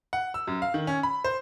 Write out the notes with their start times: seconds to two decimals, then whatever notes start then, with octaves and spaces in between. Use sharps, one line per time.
0.13 F#5
0.34 E6
0.47 F#2
0.62 F5
0.74 D#3
0.87 C#4
1.03 B5
1.24 C5